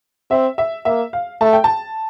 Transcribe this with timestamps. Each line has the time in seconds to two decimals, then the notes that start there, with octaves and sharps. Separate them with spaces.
0.31 C4 E5
0.58 E5
0.85 A#3 E5
1.13 F5
1.41 A3 A5
1.53 G5
1.64 A5